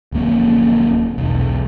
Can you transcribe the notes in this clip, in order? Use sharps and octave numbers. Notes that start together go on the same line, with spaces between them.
D1 F2 A#3 C#4
B1 E2